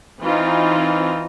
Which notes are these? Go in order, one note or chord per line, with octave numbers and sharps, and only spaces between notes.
E3 C4 D#4 F4